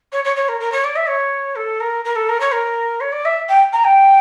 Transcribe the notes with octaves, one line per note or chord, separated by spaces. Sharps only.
C#5
C#5
C#5
A#4
A#4
C#5
D5
E5
C#5
A4
A#4
A#4
A4
A#4
C#5
A#4
C#5
D5
E5
G5
A#5
G5